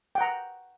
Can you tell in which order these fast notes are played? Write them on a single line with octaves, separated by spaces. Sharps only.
G5 F#5 A#5